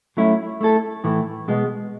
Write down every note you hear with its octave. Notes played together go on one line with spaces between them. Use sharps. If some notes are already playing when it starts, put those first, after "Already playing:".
F#3 A3 C#4 E4
A3 E4 A4
A2 E3 A3
B2 G#3 B3